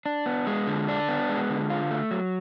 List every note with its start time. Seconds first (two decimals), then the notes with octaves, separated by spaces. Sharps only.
0.06 D4
0.26 B3
0.47 G#3
0.67 D3
0.88 D4
1.09 B3
1.29 G#3
1.50 D3
1.70 F4
1.91 A3
2.11 F#3